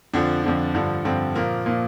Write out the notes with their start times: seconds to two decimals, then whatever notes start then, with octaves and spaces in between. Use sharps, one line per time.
0.13 F2 D3 F3 D4
0.43 F2 D3 F3
0.74 G2 D3 F3
1.05 G2 D3 F3 C4
1.35 A#2 F3 A#3
1.66 A#2 F3 A#3